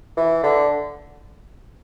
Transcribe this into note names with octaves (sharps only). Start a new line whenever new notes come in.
E3
D3